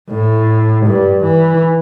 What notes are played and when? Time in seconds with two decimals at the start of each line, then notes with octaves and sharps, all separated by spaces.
0.10 A2
0.86 G2
1.24 E3